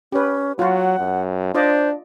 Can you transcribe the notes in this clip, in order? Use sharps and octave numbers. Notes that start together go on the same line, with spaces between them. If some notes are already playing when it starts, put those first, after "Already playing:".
C#4 G4 B4
F#3 F4 F#4 F#5
F#2
D4 F4 C5 D5 D#5